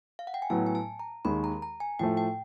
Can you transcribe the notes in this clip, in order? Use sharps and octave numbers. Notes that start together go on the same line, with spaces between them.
F5
F#5
G5
G#5
A2 F#3 B3 A5
G#5
A5
A#5
D#2 D#3 G#3 B5
A#5
A#5
G#5
A2 F3 A3 G5
G5